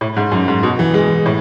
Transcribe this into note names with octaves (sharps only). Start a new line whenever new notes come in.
A2
G#2
F#2
G#2
B2
E3
G#3
A2